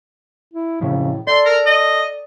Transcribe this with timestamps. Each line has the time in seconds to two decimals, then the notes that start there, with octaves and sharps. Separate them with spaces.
0.53 E4
0.81 F2 A2 C#3
1.27 A4 D5 C6
1.45 A#4
1.66 D#5